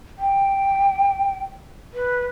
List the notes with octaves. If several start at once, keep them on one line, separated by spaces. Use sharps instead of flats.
G5
B4